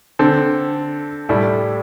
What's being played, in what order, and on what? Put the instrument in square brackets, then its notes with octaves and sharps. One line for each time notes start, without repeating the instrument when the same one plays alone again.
[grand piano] D3 C4 A4
A2 G3 E4 A4